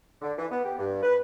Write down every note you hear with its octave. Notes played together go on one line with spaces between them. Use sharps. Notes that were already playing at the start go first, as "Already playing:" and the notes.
D3
E3
B3
G4
G2
B4